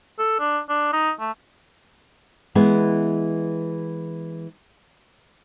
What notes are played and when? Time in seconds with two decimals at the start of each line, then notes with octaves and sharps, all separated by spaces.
0.19 A4
0.40 D4
0.69 D4
0.93 D#4
1.20 A3
2.55 E3 G#3 B3 E4